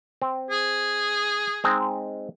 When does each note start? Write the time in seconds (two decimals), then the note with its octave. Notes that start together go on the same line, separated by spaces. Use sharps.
0.22 C4
0.51 G#4
1.64 G#3 C4 D#4